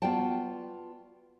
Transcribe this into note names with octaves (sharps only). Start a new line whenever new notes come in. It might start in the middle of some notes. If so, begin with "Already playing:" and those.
B3 F4 F#4 D5 G5 A5